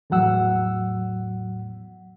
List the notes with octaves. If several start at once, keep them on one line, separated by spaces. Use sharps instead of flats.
E2 A2 F#3 F#5 E6